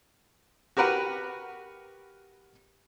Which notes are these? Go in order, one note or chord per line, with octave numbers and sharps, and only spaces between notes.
F#4 G4 A#4 B4 F#5